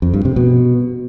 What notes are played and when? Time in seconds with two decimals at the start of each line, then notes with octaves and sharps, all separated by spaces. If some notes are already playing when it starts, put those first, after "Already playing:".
0.02 F2
0.14 G2
0.25 C3
0.36 B2